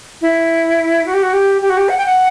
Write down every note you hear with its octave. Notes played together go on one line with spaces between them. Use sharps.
E4
F#4
G4
F#4
G4
G4
F#4
G4
F#5
G5
F#5